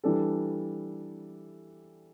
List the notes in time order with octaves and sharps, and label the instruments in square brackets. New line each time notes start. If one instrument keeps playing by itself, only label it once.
[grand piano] E3 G3 D4 A4